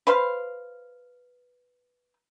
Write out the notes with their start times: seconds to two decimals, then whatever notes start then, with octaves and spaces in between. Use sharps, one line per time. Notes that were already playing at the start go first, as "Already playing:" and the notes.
0.07 B4 C5 F5